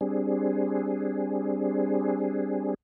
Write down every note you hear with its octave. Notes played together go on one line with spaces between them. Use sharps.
G3 C4 D4 G#4